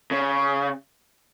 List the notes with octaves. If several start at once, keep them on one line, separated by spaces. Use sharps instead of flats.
C#3